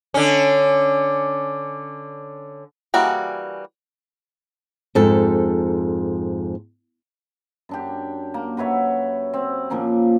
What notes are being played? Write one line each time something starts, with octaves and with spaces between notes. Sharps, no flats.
D3 C#4
E3 G3 A#3 F#4 G#4
F2 G#2 A4
F#2 D4 G4
A#3
F#4 B4 C#5 E5
C4
A#2 F3 A#3 C#4